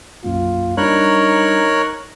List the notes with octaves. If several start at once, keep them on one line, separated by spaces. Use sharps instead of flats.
B1 F#2 A#3 F4
G3 D4 D#4 A#4 C#5 B5 F#6